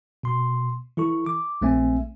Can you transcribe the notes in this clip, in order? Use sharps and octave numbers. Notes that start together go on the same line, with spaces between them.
B2 C6
E3 E4 A4 C#6
D6
A#1 A3 C4 E5 G#5